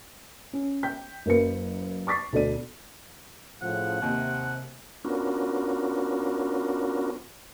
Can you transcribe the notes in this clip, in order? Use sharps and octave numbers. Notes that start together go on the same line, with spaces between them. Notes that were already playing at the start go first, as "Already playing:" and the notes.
C#4
G5 G6 B6
F#1 F#2 A#3 A#4 B4 C#7
C#6 D6 A6 B6 C7
D2 B2 A4 D5 D#7
A2 C#3 F3 F#5
D#2 C3
B3 C#4 D4 F4 F#4 A#4